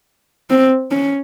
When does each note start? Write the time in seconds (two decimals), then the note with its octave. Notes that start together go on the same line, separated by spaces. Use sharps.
0.50 C4
0.91 C#4